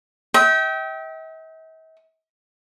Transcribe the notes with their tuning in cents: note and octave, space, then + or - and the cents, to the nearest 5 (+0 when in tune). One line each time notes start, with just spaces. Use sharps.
E5 -45 G5 -15